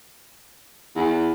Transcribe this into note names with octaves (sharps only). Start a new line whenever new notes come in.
E2